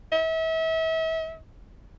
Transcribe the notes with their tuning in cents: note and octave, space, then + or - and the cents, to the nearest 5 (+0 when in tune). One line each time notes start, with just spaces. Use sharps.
E5 -35